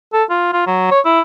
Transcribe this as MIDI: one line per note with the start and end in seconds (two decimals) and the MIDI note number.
0.13 0.24 69
0.30 0.51 65
0.53 0.65 65
0.67 0.86 54
0.91 1.00 73
1.05 1.21 64